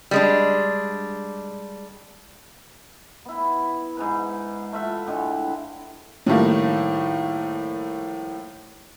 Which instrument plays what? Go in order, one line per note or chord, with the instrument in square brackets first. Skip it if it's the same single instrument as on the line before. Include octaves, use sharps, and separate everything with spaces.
[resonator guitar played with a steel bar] G3 G#3 D4
[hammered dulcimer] B3 E4
G#2 G#4 B4
A3 F4 E5 F#5
A2 D3 G#3
[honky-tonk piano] A2 D#3 F3 G3 A3 A#3